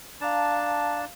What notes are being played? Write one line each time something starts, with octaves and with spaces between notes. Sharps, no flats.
D4 F5 A5 A#5